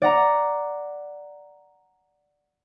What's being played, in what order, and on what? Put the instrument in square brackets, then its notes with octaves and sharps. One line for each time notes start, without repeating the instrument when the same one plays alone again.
[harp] D5 F#5 A#5